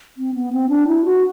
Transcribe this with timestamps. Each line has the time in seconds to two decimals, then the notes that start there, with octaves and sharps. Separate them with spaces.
0.18 C4
0.34 B3
0.53 C4
0.69 D4
0.87 E4
1.05 F#4